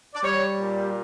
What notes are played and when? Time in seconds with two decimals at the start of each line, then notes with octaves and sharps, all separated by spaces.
0.14 D5
0.23 G3 C#5
0.57 A#2